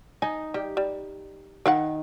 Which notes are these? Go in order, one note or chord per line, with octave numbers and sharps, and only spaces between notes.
D#4 G#5
G3 G4
G3
D#3 A#4 F5 F#5